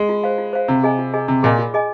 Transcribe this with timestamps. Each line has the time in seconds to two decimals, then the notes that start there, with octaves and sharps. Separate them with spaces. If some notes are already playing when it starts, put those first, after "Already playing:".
Already playing: G#3
0.09 F4
0.24 C5 F5
0.38 F4
0.53 C5 F5
0.68 C3 F4
0.83 G#4 D#5 G#5
0.99 F4
1.14 G#4 D#5 G#5
1.28 C3 F4
1.43 A#2 G#4 D#5 G#5
1.59 F4
1.74 G#4 D#5 G#5